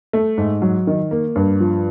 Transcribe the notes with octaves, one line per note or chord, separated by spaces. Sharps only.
A3
G#2
F#3
D#3
A#3
G2
F3